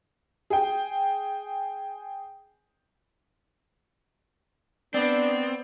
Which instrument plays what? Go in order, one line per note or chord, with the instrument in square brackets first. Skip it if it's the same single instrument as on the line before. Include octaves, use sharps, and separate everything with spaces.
[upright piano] G#4 G5
[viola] B3 [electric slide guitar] C4 [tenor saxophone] D4 [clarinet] D5